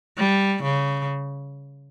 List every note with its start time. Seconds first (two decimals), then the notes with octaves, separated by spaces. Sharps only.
0.18 G3
0.64 C#3